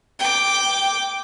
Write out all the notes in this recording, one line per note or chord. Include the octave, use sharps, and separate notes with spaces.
G5 D6